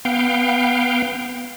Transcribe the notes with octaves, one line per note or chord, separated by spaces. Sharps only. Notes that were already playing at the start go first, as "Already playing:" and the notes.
B3 F5 G5